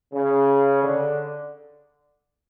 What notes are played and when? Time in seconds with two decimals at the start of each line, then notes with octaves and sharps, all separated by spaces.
0.12 C#3
0.83 D3